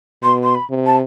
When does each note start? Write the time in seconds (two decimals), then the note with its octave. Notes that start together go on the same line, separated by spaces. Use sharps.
0.22 B2 C6
0.43 C6
0.55 B5
0.70 C3
0.86 A5